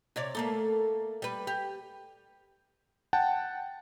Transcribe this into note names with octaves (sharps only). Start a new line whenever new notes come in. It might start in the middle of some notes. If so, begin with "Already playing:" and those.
C3 C#5 D5
A3 A#3 A4
G3 B4
G4
F#5 G5 A5